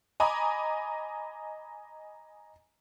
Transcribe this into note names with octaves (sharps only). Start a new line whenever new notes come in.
D#5 G#5 A#5 B5 D6